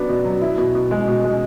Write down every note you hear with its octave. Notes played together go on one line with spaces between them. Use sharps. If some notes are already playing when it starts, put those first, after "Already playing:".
Already playing: F#3 B3 D4
B2
F#3
E4
B2
B2
G#3
B2
G#3